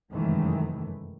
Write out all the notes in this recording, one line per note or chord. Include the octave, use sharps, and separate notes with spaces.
F1 F#2 D#3 E3 G#3 A3